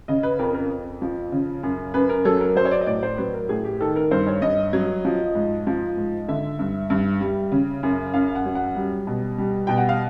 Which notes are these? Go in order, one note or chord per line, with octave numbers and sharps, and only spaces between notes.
C#3 D#5
B4
F2 A#4
A#4
F2
F3
C#3
F#2
F#2 B4
A#4
F#3 A4
A#4
F#3 C5
C#5
D5
D#5
A2 D5
C5
F#3 B4
A#4
A2 G#4
G4
D#3 A4
A#4
G2 C5
C#5
G2 D#5
F#3
F3
G#2
F3
G#2
D3 E5
G2
G2
G3
C#3
F#2
F#2 F5
F#5
F#3
F#5
G3
B2
G3
B2 G5
F#5
F5